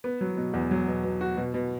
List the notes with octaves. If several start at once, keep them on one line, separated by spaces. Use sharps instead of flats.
B3
F#3
B2
E2
F#3
B2
B2
F#4
B2
B2